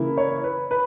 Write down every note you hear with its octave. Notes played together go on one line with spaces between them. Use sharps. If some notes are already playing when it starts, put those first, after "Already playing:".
Already playing: C#3 E3 A#3 E4
C#5
B4
B4